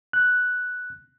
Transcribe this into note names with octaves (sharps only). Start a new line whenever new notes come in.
F#6